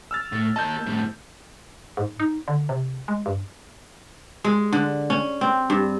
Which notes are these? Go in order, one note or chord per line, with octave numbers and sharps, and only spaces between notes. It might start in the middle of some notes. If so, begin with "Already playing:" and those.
E6 F6 A6
A2
A#3 D#5 A5 G6
F2 A2
G#2
D#4
D3
C3
G#3
G2
G#3
D3
C#4
C4
G2